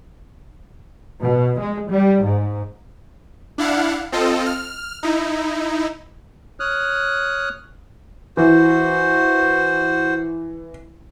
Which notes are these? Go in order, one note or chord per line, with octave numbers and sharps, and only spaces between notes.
B2
G#3
G3
G#2
D4 E4 F5 F#5
C4 F4 A4 D#5
F6
D#4 E4
C#5 D#6 F6 F#6
E3 F#4 C5